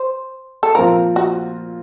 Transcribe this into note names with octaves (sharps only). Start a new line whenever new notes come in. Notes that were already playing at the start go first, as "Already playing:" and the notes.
Already playing: C5
A4
A#2 F3 C4 F4 A#4
F#4